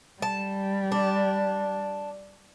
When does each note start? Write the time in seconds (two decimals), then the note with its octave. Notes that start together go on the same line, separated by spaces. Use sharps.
0.22 G3 A5
0.92 D4